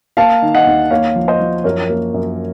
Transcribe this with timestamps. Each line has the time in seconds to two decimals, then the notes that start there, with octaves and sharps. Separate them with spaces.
0.17 A#3 F5 A5
0.42 D#3
0.54 D#5 F#5
0.67 D#2
0.90 A#3 C#5 F5
1.16 F3
1.28 C5 D#5
1.40 F3
1.64 F#2 A#4 C#5
1.89 A#3
2.14 F#2